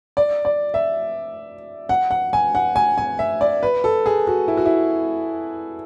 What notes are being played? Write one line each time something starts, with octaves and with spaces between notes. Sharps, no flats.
D5
D5
E5
F#5
F#5
G#5
F#5
G#5
G#5
E5
D5
B4
A4
G#4
F#4
E4
F#4
E4